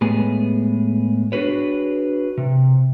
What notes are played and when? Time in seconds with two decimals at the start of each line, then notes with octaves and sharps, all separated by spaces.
0.01 A2 G#3 B3 G#4
1.32 D4 F#4 G#4 B4 C#5
2.37 C3